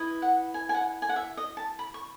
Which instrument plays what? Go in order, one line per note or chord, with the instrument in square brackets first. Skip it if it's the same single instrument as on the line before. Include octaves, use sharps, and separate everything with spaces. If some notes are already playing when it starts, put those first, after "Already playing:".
Already playing: [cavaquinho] E4 B4 D#5
F#5
G#5
G#5
F#5
G#5
F#5
E5
D#5
A5
B5
C#6